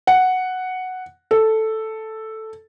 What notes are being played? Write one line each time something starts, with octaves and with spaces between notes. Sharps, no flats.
F#5
A4